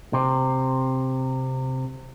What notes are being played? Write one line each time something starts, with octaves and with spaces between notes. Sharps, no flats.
C3 C4